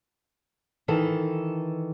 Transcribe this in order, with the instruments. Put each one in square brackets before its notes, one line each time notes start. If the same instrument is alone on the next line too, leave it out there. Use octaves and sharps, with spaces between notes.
[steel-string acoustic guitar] D#3 E3 A4